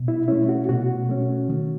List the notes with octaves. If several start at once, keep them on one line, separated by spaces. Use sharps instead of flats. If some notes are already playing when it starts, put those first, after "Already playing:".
Already playing: B2
E4
A3 C#4 E4
F#4
B2 F#4
A3 C#4
D#3